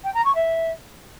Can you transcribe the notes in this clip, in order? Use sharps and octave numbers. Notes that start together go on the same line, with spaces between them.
G5
A#5
C#6
E5